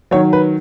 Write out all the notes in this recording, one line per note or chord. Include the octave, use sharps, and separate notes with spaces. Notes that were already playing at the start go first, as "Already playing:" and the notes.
D#3 F#3 C#5
B4